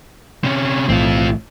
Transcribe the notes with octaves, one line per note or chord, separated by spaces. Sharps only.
C3 C#4
B1 A2 E3 C4 F4